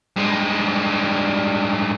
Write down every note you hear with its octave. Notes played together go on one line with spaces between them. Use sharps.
G2 G#3